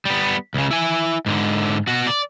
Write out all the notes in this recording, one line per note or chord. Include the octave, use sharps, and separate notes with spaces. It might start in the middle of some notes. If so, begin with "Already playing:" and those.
G3 B3
C#2 C#3
E4 G#5
G#2 D3
B2 F#4
D5